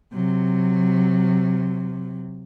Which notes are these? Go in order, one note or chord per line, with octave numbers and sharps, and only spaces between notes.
C3 F#3